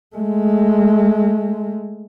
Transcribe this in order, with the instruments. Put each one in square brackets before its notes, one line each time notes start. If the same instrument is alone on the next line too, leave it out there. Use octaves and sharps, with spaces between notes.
[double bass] G#3 A3